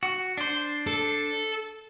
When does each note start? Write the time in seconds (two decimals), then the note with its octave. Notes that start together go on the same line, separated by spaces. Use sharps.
0.03 F#4
0.37 D4 C5
0.87 A4